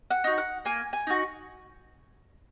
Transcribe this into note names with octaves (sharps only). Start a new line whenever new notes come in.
F#5
D#4 F#4
F#5
A#3 G#5
G#5
D#4 F#4